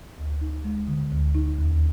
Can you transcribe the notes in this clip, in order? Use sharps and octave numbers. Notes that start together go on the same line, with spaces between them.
D2
D#4
G#3
D3
D2
D#4
D#2